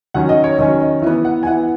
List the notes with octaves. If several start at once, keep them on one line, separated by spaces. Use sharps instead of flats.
D#3 F#3 C#4 F#5
D#5
C#5
D#3 F#3 C#4 D#5
D#5
E3 B3
F#5
G#5
E3 B3 F#5